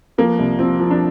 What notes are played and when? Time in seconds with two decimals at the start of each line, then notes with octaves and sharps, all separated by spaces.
0.18 F3 A#3
0.39 C2
0.59 F3 C4
0.80 F3
0.90 D4